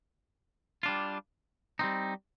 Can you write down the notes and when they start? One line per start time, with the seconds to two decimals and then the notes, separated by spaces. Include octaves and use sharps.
0.83 G3 D4 F4
1.79 G3 C4 D#4